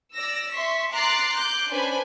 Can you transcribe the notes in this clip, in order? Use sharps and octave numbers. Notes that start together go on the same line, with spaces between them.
D5 E6 A#6
E5 C6 C#6 B6
A#5 C6 D6 F#6 A6 C7
D6 F#6 G6
C#4 D4 B4 C5 G#5 B5